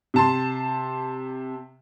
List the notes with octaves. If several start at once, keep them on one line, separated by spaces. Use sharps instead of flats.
C3 A5 C6